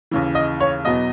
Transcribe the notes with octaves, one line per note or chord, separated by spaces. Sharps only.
D#2 C#3 E3
D#5
C#5
E2 B2 F#3 B3 D#5